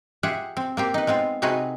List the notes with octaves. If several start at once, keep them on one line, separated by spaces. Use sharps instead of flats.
F4 G4 G#4 E5 F#5
C4
A#3 C4 G4
D#4 B4
G#3 B3 C4 F4
C3 C4 D#4 F#4 G#4 B4